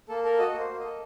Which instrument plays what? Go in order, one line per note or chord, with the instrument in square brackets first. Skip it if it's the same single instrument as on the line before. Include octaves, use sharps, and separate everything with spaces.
[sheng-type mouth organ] A#3 A4
A4 A#4
F#4 D#5
A#3 C5
A#3
A4 D#5